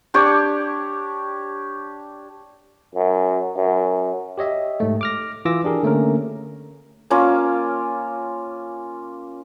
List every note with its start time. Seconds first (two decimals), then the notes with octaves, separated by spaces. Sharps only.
0.14 D4 G4 C#5
2.95 F#2
3.57 F#2
4.38 G4 C#5 D#5 E5
4.80 G#2 A3
5.01 D6 F6 A#6
5.45 E3 F4 D6 E6 A#6
5.64 D4 G4 G#4 A#4
5.83 D3 A3 A#3 C#4 A#4
7.10 A#3 C#4 F4